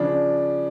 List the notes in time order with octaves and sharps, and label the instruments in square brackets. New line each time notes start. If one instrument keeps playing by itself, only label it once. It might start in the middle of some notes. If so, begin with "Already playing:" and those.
Already playing: [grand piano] C#3 F3 D4